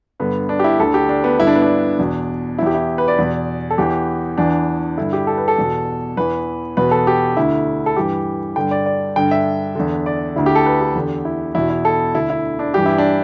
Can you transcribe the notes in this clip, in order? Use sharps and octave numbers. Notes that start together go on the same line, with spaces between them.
G2 D3 B3
D4
G4
E4
D2 D3 A4
G4
D4
B3
G2 D3 E4
D4
B3
D4
E2 B2
E2 E3 E4 G4
E4
B4
D5
E2 B2
A4
E2 E3 G4
E2 E3 D4
G2 D3 E4
G4
A4
B4
A4
E2 B2
E2 E3 B4
E2 B2 B4
A4
G4
D2 D3 E4
A4
G2 E3 G4
G2 D3 G5
D5
D5
G2 D3 G5
E5
E2 D3
D5
D2 D3 E4
G4
A4
B4
G4
E2 D3
E4
E2 B2 E4
E4
A4
D2 D3 E4
E4
D4
G2 E3 G4
E4
D4